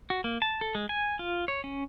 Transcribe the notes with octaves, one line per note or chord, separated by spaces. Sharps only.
F#4
A#3
A5
A4
G#3
G#5
F4
C#5
C#4